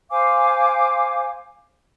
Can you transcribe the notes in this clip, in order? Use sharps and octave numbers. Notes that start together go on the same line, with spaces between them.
C5 F5 G#5 D6